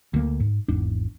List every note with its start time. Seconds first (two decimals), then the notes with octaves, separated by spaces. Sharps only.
0.14 D2 A#3
0.40 G#2
0.68 G#1 E2 G#2 D4